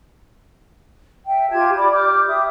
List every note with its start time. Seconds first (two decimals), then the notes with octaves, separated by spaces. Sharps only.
1.26 E5 G5
1.51 F4 G4 A5 G#6
1.76 D5 B5 D6
1.92 D6 F6 G6
2.27 G4 E5 D#6